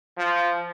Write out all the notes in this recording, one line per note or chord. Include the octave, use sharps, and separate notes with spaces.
F3